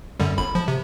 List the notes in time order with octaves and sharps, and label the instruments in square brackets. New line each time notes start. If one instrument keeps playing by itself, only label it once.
[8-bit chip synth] F#2 D3 G3
G1 B5
F3
C3